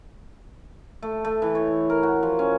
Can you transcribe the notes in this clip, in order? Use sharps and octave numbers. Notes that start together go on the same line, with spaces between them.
A3
A3
E3
C#5
A#4
F#4
F3
C#4